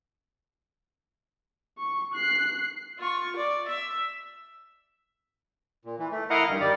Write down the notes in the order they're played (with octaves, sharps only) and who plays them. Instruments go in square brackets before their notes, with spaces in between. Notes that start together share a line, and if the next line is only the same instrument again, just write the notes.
[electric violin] C#6
F#6 C7
[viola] F4 C#6
D5
E5
[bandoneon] A#2
E3
A3
E4 A#4 D#5 F5 F#5 A#5
G2 D#3
D#3 G3 D5